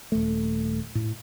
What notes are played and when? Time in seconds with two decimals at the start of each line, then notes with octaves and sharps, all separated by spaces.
0.12 D#1 A3
0.95 A2